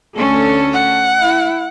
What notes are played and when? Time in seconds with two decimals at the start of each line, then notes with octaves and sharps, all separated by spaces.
0.15 D2 C#4 A4
0.73 F#5
1.20 E4